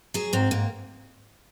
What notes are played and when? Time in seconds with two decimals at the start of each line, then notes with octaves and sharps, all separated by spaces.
0.14 F#3 G#4
0.33 G#2 C4
0.51 G#2 A#3